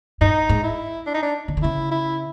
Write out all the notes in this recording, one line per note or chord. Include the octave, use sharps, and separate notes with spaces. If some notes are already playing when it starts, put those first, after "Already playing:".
G2 D#4
G#2
E4
D4
D#4
D4
C#3
D3
C#3 E4
E4